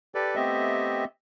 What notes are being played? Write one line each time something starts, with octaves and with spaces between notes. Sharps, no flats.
G4 A4 B4 D5
A3 B3 C4 G4 D#5 E5